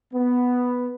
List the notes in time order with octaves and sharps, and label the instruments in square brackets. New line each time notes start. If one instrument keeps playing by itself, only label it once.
[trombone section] B3